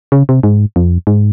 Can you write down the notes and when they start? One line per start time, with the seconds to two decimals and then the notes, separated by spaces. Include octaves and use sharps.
0.12 C#3
0.29 C3
0.43 G#2
0.76 F2
1.07 G#2